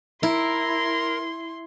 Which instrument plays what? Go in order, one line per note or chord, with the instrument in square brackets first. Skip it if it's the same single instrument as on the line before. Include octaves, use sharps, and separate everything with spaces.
[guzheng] E4 [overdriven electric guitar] A#4 [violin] C6